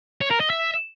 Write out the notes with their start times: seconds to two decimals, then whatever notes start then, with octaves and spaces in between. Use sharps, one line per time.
0.21 C#5
0.31 A#4
0.40 D#5
0.50 E5